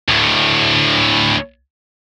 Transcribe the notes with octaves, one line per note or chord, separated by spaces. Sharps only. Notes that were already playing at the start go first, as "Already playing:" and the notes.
D2 A2